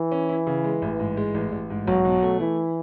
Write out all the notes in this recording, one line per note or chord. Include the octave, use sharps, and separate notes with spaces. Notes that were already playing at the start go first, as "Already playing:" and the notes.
Already playing: E3
C#4
E4
C#3
G#3
A1
G#2
G#3
A1
A1
G#2
B1 F#3
B2
A3
E3 E4